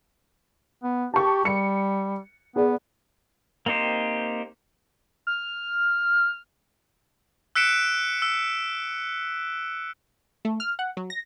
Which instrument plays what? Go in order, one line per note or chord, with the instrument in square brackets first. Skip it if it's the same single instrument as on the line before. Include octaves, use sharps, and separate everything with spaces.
[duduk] B3
[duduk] G4 [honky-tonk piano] A5 C#6
[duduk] G3 [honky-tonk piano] C#7
[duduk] B3 [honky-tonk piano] G#4 D5
[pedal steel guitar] A#3 C4 D#4 G4 C5
[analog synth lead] F6
[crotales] E6 F#6 B6 C#7 D7 E7
E6
[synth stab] A3
F6
F#5
F#3
A#6